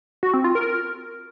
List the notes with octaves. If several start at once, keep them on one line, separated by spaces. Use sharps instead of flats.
F#4
C4
F4
A#4